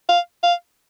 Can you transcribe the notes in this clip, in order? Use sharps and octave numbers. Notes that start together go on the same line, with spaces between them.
F5
F5